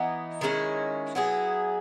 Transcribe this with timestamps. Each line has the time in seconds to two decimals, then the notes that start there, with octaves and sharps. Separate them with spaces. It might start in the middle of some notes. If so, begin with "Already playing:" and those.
Already playing: E3 B3 D#4
0.41 D#3 G#3 C#4 E4
1.15 F#3 B3 E4 G#4